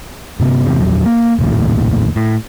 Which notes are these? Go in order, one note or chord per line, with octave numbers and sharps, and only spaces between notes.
G1 C3 B3
E2 C3
A#1 E2 F#3
A#3
F1 A#1 D#2 A2
A2